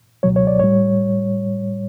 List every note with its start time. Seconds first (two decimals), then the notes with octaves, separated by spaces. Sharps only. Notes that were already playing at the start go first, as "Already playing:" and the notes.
0.23 C#2 B2 F#3 C#5
0.36 C#5
0.47 D5
0.60 A2 G3 C#5